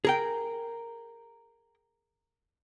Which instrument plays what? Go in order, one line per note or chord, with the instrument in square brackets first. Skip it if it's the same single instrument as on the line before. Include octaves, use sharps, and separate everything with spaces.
[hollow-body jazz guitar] G#4 A#4 G5